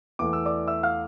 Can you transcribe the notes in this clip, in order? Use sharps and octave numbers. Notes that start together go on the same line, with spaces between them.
E2 E3 A3 D6
E6
D5 D6
E5 E6
F5 F6